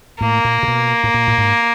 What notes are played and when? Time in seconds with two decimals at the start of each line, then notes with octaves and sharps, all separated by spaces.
0.21 A2 A#3
0.45 A#2
0.63 C3
0.68 B2
1.04 A2
1.14 A#2
1.28 A2
1.38 G#2